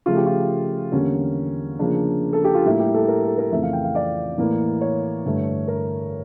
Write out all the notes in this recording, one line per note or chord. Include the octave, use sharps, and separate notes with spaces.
C#3 F3 A3 F4
G4
F4
E2 D3 G3 A#3 C#4
C#3 F3 A#3 D4
A4
G4
F4
A2 G3 A#3 E4
G4
A4
A#4
A4
A#4
F2 C#3 E3 A3 E5
F5
G5
F5
D5
A2 E3 A#3
C#5
G2 D3 A3
A#4